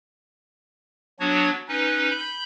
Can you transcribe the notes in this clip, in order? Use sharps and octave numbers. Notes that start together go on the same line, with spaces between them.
F#3 B3 D4 F#4 C#5
C#4 D#4 B4
B5 G6